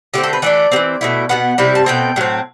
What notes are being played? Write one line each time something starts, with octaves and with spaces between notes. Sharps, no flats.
D3 A3 C4 G4
A4
B4
E3 A3 D4 D5
E3 G3 C4
B2 A3 E4
B2 F#3 B3 F#5
C3 G3 C4 E4
A5
B2 A3 C4 G5
A2 F#3 C4